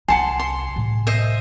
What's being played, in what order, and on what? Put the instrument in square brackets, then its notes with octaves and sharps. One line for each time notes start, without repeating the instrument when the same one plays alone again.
[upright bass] C2 C4 [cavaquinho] F#5 A5 C6 [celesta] G#5
[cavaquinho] C6
[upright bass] A2 C3
[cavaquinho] C5 D#5 E5